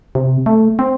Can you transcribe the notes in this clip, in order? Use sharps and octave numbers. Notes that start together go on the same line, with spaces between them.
C3
A3
C4